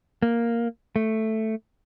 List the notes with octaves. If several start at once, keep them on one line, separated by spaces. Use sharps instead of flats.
A#3
A3